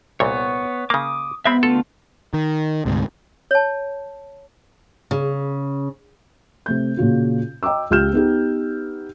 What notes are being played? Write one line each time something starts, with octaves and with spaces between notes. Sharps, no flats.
C2 A#2 B3 C#5
C#3 A#3 D6 D#6
G#3 B3 C4 E5 B5
D3 A3 F4 A4
D#3
D2 G#2 C3
C#5 A5
C#3
C3 A3 G6
A#2 C#3 F4 F#4
D#5 G5 A#5 D6 E6
C#2 F4 G4 F6 G6 E7
B3 D#4 G4